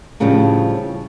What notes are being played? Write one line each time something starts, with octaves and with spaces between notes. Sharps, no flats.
A2 C#3 F3 G3 C4 D4